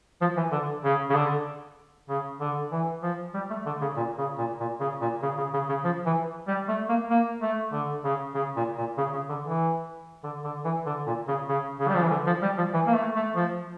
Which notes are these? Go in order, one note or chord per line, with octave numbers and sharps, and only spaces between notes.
F3
E3
D3
C#3
C#3
D3
C#3
D3
E3
F3
G3
A3
D3
C#3
A#2
C#3
A#2
A#2
C#3
A#2
C#3
C#3
C#3
C#3
F3
E3
G3
A3
A#3
A#3
A3
D3
C#3
C#3
A#2
A#2
C#3
C#3
D3
E3
D3
D3
E3
D3
A#2
C#3
C#3
C#3
G3
F3
E3
D3
F3
G3
F3
E3
A#3
A3
A3
F3